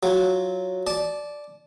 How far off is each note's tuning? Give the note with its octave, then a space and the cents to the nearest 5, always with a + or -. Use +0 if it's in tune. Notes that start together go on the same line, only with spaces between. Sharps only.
F#3 +0 F4 +0
D5 +0 A5 -30